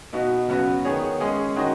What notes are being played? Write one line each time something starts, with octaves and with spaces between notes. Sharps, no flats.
B2 B3 D#4 F#4
C#3 F#3 B3 F#4 B4
D#3 B3 G#4 C#5
G#3 C#4 G#4
D#3 G#3 C#4 F#4 D#5